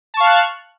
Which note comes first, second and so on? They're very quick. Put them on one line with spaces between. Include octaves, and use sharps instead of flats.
A5 C#6 F5 F6 F#6